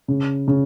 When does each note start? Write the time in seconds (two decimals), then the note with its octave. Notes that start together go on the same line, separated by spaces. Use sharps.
0.08 C#3
0.48 C#3